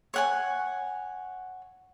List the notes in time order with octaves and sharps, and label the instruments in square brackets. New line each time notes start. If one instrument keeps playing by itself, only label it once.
[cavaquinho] C#5 F#5 G#5